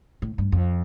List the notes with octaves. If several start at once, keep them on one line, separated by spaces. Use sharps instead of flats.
A2
G2
F2